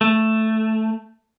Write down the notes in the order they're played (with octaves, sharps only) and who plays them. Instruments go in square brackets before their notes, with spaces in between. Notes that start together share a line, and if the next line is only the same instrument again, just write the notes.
[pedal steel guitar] A3